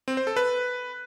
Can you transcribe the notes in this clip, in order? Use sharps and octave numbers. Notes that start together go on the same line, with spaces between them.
C4
C5
A4
B4